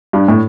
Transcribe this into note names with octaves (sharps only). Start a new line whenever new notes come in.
G2
A2